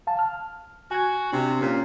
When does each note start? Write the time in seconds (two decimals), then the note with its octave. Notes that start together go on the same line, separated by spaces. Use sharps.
0.07 F5 A5
0.19 F6
0.91 F#4 G#5 G#6
1.33 C3 D4
1.61 A#2 C#4